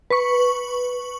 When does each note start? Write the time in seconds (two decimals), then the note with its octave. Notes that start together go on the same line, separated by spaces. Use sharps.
0.10 B4 C#6